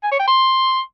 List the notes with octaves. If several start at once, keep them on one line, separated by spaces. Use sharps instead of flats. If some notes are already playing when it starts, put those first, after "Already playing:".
G#5
C#5
G5
C6